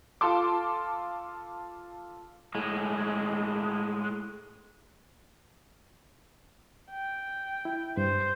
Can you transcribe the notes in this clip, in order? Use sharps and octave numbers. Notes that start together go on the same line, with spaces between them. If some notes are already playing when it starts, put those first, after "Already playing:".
F4 A4 A5 C6 D6
A2 G#3
G5
E4
G2 C5